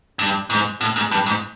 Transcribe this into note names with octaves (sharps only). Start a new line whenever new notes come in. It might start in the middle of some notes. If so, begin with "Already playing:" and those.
G2
G#2
A2
G#2
G2
G#2